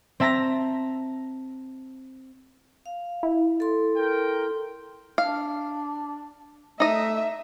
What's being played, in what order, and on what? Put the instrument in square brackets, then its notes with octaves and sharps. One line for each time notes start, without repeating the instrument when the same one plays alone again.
[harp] C4 E5 A5 A#5 A#6
[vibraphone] F5
[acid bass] E4
[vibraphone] A4 C6
[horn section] A#4 G5
[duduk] D4 [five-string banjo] F5
[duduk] A3 [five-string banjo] D#4 D#5 [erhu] E5